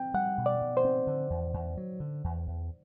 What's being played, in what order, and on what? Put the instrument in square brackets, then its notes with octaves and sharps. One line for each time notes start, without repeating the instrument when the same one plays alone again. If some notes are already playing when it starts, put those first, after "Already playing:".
Already playing: [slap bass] C4 [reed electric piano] G5
[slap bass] G3 [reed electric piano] F#5
[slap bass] B2
[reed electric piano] D5
[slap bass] B2
[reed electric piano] C5
[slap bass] C4
D3
E2
E2
F#3
D3
E2
E2